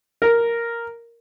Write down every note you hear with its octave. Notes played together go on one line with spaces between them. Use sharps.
A#4